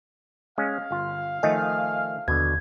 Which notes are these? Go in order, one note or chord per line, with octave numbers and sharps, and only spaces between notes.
G#3 C#4 F5
G1 F4
D#3 F3 A3 D#5 G#5
D#2 B2 D3 G#6